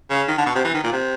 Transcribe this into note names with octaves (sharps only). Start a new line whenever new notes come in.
C#3
D#3
D3
B2
C3
E3
D#3
A#2
C3